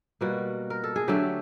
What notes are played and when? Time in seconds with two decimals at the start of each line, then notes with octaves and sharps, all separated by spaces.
0.21 B2 G3 A#3 F#4
0.70 A#4
0.84 A4
0.96 G#4
1.08 D3 F#3 A3 G4